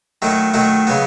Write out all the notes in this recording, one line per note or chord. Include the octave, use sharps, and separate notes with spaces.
D#3 F#3 A3 E4
D#3 F#3 A3 E4
C#3 F#3 B3